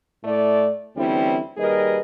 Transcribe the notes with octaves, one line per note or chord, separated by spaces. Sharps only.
A2 A3 D5
D2 E3 G3 C4 C#4 E4
D#2 G3 G#4 A#4 B4 D#5